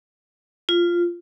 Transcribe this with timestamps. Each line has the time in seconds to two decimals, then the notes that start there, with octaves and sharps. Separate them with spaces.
0.69 F4